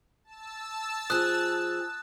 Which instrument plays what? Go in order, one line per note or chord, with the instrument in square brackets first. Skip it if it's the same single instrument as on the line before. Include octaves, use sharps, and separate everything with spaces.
[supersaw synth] A5 E6
[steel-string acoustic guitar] F3 G#4 [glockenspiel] D#6 F#6